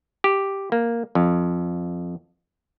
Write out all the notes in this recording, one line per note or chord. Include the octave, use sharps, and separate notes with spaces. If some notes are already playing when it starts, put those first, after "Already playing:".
G4
A#3
F2